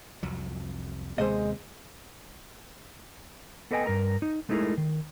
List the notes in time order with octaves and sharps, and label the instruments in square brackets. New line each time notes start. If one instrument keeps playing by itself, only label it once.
[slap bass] C2 F2 F#3
[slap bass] D#2 C3 B3 [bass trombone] G#3 [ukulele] C5 D#5
[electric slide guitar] B3 A4 B4 D#5 G5 G#5
G2 A#4 A#5
D#4
G#3 A3 D#4 E4 G#4 A#4
D#3